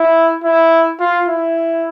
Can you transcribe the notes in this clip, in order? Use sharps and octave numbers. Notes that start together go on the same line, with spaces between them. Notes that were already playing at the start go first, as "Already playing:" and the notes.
Already playing: E4
E4
F4
E4